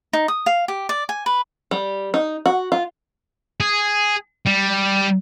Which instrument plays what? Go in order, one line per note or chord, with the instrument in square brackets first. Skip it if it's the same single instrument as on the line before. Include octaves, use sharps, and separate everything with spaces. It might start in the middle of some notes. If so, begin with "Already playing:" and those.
[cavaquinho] D#4
D#6
F5
G4
D5
G#5
B4
[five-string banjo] G3
D#4
F#4
F4
[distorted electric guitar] G#4
G3